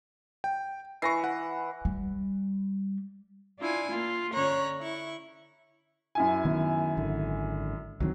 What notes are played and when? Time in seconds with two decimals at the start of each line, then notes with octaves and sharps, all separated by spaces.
0.44 G5
1.02 E3 C#6 A#6 C7
1.24 F#5
1.85 G3
3.59 D4 E4 F4 G#5
3.90 A#3 F4
4.33 D3 C#4 C#5 A#5 F#6
4.80 E4 C#6
6.15 F#2 E4 G#5
6.45 D#3 B3
6.97 G#1 D3
8.00 C2 D#3 F#3 C4